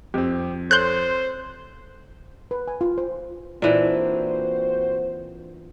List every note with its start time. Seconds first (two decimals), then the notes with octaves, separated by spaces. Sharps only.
0.14 F2 C4 G4
0.71 A4 C5 C#5 C6 F#6 G6
2.51 B4
2.68 G#5
2.81 F4
2.98 C5
3.62 A#2 E3 C4 D4 F#4 C5